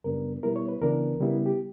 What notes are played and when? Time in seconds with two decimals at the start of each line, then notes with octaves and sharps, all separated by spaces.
0.04 F#2 C#3 G3 B3 D4 A#4
0.43 B2 G3 B3 E4 A#4
0.56 C#5
0.69 B4
0.81 C#2 C#3 E3 B3 D4 A#4
1.20 C#3 G3 B3 E4
1.46 G4